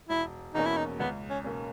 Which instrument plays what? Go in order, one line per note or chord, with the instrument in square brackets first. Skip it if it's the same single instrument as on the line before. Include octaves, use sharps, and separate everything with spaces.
[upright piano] E1 [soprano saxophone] E4
[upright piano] E2 B2 A#3 C#4 [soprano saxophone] D#4
[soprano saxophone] E4
D#4
[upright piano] C#2 [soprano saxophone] B3
[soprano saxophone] C#4
[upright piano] B2 A#3 C#4